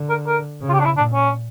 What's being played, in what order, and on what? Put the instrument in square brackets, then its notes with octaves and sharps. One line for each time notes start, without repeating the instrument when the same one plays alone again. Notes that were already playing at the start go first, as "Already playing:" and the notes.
Already playing: [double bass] D3
[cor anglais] A#4
A#4
[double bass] C#3
[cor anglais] F4
G4
D4
E4
[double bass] A#2 [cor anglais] D4
[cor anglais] C#4